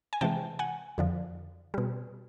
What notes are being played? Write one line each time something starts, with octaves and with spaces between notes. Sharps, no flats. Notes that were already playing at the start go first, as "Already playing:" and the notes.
G#5
C3 E3 G#3 G5 A5
F#5 G#5
F2 D3 F3
B2 G3